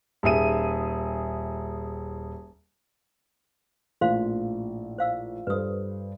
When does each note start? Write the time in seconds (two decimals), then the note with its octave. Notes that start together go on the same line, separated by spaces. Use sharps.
0.23 D#1 G#4 E5 D#7
4.01 A#1 A2 C5 F5 C6
4.98 C5 F5 E6
5.47 G2 A4 B4 C5 D#6